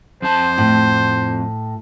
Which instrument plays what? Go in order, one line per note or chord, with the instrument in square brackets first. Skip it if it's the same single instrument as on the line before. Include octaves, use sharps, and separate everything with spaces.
[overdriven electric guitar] F2 A5 [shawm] C5
[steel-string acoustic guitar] A2